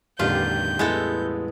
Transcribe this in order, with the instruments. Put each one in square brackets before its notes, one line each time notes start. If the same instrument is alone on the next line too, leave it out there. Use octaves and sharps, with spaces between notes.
[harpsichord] A1 E2 G2 [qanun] D3 D#3 G4 [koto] F4 [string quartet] G6
[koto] G#3 B3 A4 [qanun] E4